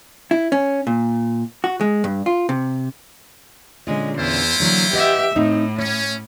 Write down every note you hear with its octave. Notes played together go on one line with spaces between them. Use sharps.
E4
C#4
A#2
F#4
G#3
G2
F4
C3
A#2 D3 G#3 C#4
E2 E4 F4 C5
D3 E3 F#3 A#3
G4 B4 D#5 E5 F#5
A2 C4 D#4
C#4 C#5